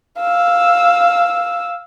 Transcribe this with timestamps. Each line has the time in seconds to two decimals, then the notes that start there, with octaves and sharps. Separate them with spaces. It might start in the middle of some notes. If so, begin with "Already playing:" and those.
0.21 F5 E6